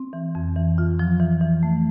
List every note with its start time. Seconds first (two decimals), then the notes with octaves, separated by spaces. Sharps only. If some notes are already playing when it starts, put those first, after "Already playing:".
Already playing: C4
0.13 E3
0.35 F2
0.56 E3
0.78 F4
0.99 F3
1.20 E3
1.41 E3
1.63 A3